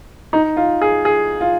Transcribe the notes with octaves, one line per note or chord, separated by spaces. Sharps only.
D#4
F4
G#4
G#4
F4